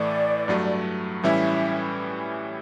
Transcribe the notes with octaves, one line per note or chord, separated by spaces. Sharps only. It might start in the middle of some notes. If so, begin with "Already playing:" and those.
Already playing: A2 E3 A3 D5
G2 F#3 A3
A2 E3 G3 C#4 E4 E5